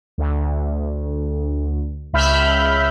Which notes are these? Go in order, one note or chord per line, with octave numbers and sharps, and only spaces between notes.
D2
C#2 E5 B5 F6 G6